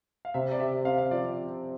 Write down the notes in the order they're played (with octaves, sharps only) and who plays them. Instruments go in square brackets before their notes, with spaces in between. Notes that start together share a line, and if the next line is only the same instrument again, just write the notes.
[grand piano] F5
[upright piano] C3 [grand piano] E5
[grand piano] D5
[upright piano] G4 [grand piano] E5
[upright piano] C4 [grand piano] F5
[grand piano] F5
[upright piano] F3 [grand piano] D5